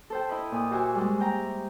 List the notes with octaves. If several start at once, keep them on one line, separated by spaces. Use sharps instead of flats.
A4 C5 G5
E4 D#5 B5
A#2 D#6
F#4 G4 C5 E5 G#5 C#6
G3 G#3
G5 A#5